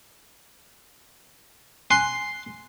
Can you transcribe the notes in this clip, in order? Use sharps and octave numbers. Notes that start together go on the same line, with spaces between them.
G#5 C6 F#6